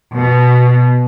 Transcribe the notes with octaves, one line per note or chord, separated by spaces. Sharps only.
B2